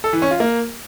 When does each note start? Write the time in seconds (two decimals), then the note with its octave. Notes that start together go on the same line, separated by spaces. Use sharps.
0.04 A4
0.13 E3
0.22 C#4
0.31 F4
0.40 A#3